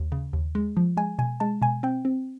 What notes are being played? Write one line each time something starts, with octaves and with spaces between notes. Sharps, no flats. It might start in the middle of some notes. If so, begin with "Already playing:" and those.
Already playing: D#2
C#3
D#2
G#3
F3
G#3 G#5
B2 G#5
G#3 A5
B2 G#5
C4 G5
C4